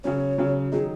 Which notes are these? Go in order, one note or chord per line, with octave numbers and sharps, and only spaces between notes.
C#3 F#3 C#4 C#5
C#3 F#3 C#4
D#3 F#3 D#4 G#4